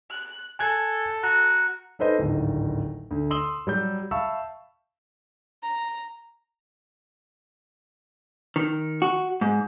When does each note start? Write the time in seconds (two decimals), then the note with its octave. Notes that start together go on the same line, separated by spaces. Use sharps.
0.10 F#6
0.59 A4 G#5 F#6 G#6
1.23 F#4 A#5
1.99 D#4 A4 B4 C5 D#5
2.19 D1 G#1
3.11 D2
3.31 C6 D#6 E6 F#7 G7
3.67 F#3 G3 G6
4.11 E5 F5 A5 B5 C#6 E6
5.63 A#5
8.56 D#3
9.02 F#4
9.41 G#2